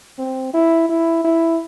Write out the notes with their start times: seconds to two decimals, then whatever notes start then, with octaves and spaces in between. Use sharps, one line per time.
0.19 C4
0.54 E4
0.89 E4
1.25 E4